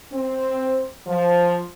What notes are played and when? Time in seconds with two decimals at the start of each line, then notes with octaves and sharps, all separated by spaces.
0.11 C4
1.05 F3